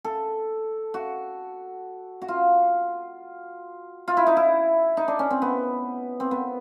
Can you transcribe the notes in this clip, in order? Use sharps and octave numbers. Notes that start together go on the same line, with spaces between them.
A4
F#4
F#4
F4
F4
E4
D#4
E4
D#4
D4
C#4
C4
B3
C4
B3